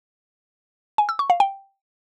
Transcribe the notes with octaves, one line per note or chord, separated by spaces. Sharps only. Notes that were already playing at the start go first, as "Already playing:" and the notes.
G#5
E6
C#6
F5
G5